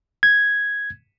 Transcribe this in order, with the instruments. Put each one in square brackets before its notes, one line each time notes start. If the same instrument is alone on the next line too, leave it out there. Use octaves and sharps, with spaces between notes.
[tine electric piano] G#6